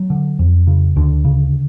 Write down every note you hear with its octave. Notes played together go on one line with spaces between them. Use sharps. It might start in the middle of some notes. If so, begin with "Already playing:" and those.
Already playing: F#3
D3
F2
C#3
D2 D3
C#3